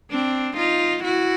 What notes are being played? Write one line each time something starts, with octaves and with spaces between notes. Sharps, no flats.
C4 D4
D#4 F4
E4 F#4